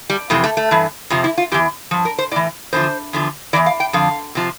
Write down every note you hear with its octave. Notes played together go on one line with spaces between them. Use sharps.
G3
F2 C3 E3 A3
A3
A3
G2 E3
F2 C3 F3
E4
F4
E2 E3 G4
G2 F3
A#4
C5
A2 E3 D5
E2 D3 F3 C5
E2 D3 F3
E2 C3 E3 D5
F5
G5
F2 D3 F3 F5
C3 F3